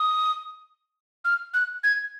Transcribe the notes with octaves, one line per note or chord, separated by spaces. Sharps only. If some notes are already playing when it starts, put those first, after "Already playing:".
Already playing: D#6
F6
F#6
G#6